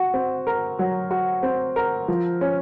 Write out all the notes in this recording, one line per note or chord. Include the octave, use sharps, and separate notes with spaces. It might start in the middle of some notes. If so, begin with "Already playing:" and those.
Already playing: F#4
C4
A#4
F#3
F#4
C4
A#4
F3
C#4